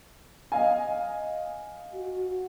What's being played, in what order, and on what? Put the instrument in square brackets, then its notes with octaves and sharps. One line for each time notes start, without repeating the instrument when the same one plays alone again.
[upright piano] D#5 F5 G#5
[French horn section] F#4